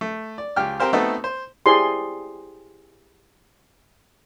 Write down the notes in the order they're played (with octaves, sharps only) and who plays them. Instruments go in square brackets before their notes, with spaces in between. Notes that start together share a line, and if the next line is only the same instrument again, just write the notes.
[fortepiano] A3
D5
C#2 G4 G5 F6
C4 G4 A#4 C5 F5
A3 B3 C4 D#4 F#4 A4
C5
[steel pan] E4 G4 G#4 C5 D5 C6